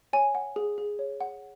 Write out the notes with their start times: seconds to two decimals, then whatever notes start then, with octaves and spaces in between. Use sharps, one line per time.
0.13 C#5 G#5
0.35 F#5
0.56 G#4
0.78 G#4
0.99 C#5
1.21 F#5